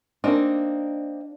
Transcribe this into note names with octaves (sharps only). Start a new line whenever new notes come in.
A#3 C4 D4 D#4